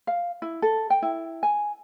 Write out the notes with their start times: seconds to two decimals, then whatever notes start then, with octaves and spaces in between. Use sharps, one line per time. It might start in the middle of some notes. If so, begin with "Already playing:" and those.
0.07 F5
0.42 E4
0.62 A4
0.90 G5
1.02 E4
1.43 G#5